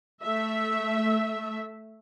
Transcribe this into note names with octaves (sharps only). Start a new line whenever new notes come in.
A3 E5